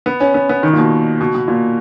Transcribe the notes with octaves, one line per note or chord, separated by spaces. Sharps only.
B3
C#4
B3
B3
D#3
A#2
B2
B2
B2
A#2